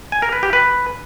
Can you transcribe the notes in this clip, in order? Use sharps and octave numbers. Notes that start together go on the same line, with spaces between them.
G#5
A#4
B4
G4
B4